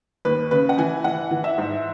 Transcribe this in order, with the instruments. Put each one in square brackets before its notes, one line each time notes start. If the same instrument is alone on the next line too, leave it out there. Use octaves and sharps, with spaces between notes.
[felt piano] D#2 B4
C#3 B4
F#5
E3 G#5
E3 F#5
E3
E5
G#2